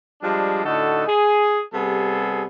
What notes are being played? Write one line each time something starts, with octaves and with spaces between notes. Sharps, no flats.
F3 G3 G#3 D4
A2 D3 D#4 F#4 A4
G#4
C3 G3 B3 G#4 A4